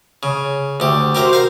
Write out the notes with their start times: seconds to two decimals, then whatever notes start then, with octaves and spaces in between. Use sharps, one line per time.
0.23 C#3
0.80 D2 G4
1.15 F#4 G4 A#4 C5 E5
1.33 A#4 F5